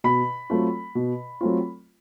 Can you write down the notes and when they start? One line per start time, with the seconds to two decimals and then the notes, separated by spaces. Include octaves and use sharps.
0.04 B2 B5
0.50 F#3 A3 C4 F4
0.95 B2
1.41 F#3 A3 C4 F4